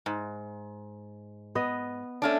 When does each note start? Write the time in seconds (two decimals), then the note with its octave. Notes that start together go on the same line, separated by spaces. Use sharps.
0.06 G#2
1.55 B3 D#5
2.22 A3 C#4 D4